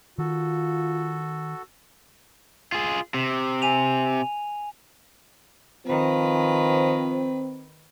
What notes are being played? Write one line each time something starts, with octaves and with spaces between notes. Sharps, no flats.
D#3 F4 F#4 A4
F4 G#4
C3
G#5 D#7 F7
D#3 F3 C4 B4